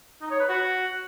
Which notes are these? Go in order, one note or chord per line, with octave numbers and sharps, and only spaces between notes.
D#4
C#5
B4
F#4